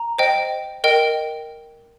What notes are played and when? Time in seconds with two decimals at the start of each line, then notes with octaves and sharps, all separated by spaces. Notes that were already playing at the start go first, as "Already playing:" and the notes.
Already playing: A#5
0.18 C5 D#5 G5
0.84 A#4 D#5 G5